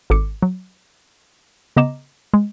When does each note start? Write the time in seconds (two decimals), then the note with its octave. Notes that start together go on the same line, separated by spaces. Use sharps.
0.10 G#1 A4 D6 C#7
0.42 F#3
1.76 C#3 B3 D#5 A#5 D6 E7
2.34 G#3